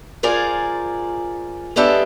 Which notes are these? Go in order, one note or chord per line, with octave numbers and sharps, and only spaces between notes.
F4 G#4 A#4 C5 D5 G#5
G#3 B3 D4 G4 A4 E5